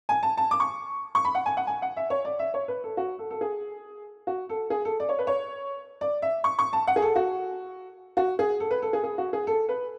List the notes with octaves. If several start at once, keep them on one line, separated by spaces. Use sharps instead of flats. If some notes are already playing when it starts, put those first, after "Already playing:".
G#5
A5
A5
D6
C#6
C#6
B5
F#5
G#5
F#5
G#5
F#5
E5
C#5
D5
E5
C#5
B4
A4
F#4
A4
A4
G#4
F#4
A4
G#4
A4
D5
C#5
B4
C#5
D5
E5
C#6
C#6
A5
F#5
G#4
A4
F#4
F#4
G#4
A4
B4
A4
G#4
G#4
F#4
G#4
A4
B4